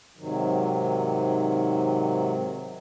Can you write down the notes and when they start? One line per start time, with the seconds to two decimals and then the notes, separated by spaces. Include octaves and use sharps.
0.17 G#2 C3 D#3 F#3